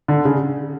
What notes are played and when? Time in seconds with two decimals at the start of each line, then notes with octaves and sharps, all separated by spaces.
0.08 D3
0.25 C#3